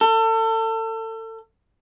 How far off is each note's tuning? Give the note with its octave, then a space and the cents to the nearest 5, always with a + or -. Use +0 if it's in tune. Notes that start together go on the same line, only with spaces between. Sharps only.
A4 +30